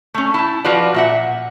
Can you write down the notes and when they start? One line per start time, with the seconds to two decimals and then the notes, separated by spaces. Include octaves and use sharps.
0.14 A3 C#4
0.34 E4 A5
0.64 F3 F4 F#4 B4 D5
0.94 A#2 E5 F#5